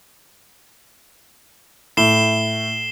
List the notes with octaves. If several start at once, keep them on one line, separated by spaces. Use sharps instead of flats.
A2 C7 E7 G7